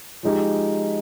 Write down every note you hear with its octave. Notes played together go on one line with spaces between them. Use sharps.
F3 G#3 D#4 G4